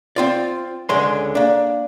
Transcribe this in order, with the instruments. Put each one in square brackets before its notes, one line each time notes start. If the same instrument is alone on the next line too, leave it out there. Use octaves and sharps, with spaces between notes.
[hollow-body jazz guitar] C4 F4 D5
C#2 D3 G#3 G#5 C6
A#3 D4